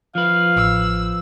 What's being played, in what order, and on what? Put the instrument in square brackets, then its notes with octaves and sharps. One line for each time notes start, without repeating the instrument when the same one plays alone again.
[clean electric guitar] F3 B4 [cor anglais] F5
[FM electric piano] A1 [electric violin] E6